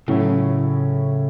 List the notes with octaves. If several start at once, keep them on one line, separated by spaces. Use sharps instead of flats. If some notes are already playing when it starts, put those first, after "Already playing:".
A2 C#3 F#3 C#4 E4